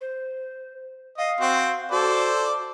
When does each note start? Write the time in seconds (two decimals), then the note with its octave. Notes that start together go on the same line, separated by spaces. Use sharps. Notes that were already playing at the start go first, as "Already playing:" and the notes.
0.01 C5
1.18 D#5 F5
1.41 C4 F#4 C5
1.91 F#4 A4 C5 D5